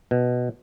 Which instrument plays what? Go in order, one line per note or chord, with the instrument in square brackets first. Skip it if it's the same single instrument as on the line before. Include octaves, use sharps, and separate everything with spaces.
[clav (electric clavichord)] B2